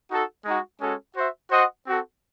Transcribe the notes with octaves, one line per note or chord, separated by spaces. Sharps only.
D#4 F#4 A4
G#3 D#4 F#4
G#3 C#4 F#4 A4
F#4 C5 E5
F#4 C5 D#5 F#5
C4 F#4 A4